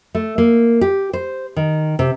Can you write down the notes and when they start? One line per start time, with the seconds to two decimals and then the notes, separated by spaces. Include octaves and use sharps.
0.15 A3
0.38 A#3
0.81 G4
1.13 C5
1.56 D#3
1.99 C3